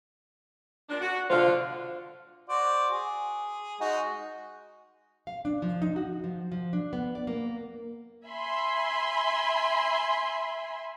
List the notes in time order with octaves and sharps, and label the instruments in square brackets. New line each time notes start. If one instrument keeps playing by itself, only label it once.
[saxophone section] A#2 D4
F#4
[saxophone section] D3 F4 [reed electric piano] C5 F5
[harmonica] F#4 C5 D5
G#4
G#3 D#4 F#4
[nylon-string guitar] F5
D4
F3
D#4
F#4
F3
F3
D4
B3
D5
A#3
[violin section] E5 G#5 B5 C6